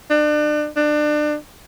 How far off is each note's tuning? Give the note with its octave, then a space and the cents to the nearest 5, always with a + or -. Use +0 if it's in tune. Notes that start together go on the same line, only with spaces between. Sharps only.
D4 +35
D4 +30